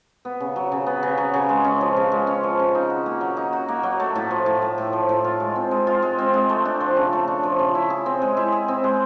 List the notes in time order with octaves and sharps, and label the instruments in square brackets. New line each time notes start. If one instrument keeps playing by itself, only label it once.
[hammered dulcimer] B3
C#3
F#3
C#3
B3
C#3
F#3
C#3
G#3
C#4
F3
C#3
G#3
C#4
F3
C#3
D#4
F#4
A#3
F#3
D#4
F#4
A#3
F#3
A3
A2
F3
A2
A3
A2
F3
A2
F4
G#3
C4
G#3
F4
G#3
C4
G#3
A3
D4
F3
C#3
A3
D4
F3
C#3
E4
G#4
C4
G#3
E4
G#4
C4
G#3